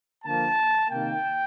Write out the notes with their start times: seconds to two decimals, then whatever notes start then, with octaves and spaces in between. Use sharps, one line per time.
0.25 D3 F3 A#3 A5
0.90 C3 D#3 A#3 G5